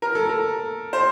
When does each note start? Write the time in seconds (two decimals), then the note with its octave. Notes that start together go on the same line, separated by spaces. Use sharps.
0.02 A#4
0.15 A4
0.29 A#4
0.93 C5